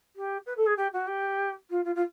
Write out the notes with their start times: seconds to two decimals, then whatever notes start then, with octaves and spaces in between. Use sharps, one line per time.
0.16 G4
0.46 B4
0.57 A4
0.66 G#4
0.77 G4
0.93 F#4
1.07 G4
1.70 F4
1.84 F4
1.95 F4